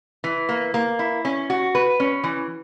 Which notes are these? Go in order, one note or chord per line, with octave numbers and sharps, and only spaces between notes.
E3
A#3
A#3
E4
C#4
F#4
B4
C#4
E3